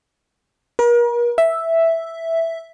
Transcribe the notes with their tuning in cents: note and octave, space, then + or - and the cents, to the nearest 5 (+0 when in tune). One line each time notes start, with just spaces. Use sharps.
A#4 +40
E5 +0